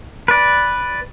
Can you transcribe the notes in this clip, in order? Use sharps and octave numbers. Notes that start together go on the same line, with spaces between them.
B4 D5